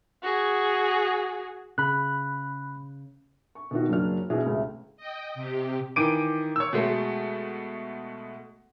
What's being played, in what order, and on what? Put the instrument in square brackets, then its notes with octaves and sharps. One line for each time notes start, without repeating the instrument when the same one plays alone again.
[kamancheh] F#4 G#4
[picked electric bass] C#3 [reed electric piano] B5 F#6
[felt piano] C#6
B2 D#3 F#4
F#1 F#3 D4 F6
B2 E3 D4 E4 F#4 G#4
C#2 A2 C3
[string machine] D#5 G5
C3 G4
[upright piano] D#3 E3 D6 D7 D#7
C#5 E6
B2 G#3 A3